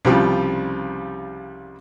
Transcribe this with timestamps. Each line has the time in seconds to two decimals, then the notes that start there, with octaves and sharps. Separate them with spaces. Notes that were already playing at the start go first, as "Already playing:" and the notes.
0.05 C2 C#3 F3 G3